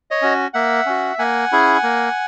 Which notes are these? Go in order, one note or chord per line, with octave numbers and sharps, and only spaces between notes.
C#5 D#5
C#4 F#4
A#3 E5 F#5
C#4 F#4
A#3 F#5 G#5
C#4 E4 G#4
A#3